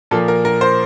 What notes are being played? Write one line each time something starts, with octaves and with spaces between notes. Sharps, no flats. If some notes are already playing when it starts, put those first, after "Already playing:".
A#2 F3 A#3 A4
A#4
A#4
C5